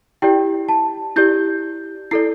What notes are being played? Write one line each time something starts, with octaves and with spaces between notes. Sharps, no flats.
E4 G4 D5 G5
A5
E4 G4 D5 G6
E4 A4 D5 C7